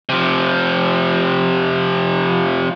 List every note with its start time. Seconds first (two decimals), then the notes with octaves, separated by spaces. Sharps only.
0.09 C3 F3